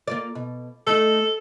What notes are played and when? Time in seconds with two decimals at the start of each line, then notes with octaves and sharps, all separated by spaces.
0.07 A#3 F4 D5
0.35 B2
0.87 A3 D#4 A4